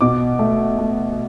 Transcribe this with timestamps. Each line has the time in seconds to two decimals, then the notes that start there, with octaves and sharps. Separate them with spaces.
0.01 B2 D6
0.39 A3
0.78 A3